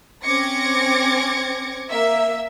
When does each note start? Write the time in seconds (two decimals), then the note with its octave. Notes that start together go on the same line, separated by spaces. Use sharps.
0.24 C4 C#4 D6 G#6 A#6 C#7
1.89 A#3 E5